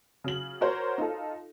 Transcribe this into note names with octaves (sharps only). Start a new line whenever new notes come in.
C#3 F#3 F#7
F#4 A#4 C5 C#5
D#4 F4 A4